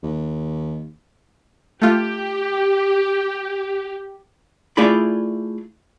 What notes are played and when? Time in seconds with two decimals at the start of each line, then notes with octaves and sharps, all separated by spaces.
0.03 D#2
1.82 A3 F4 G4
4.77 A3 E4 F4 G#4 D5 B5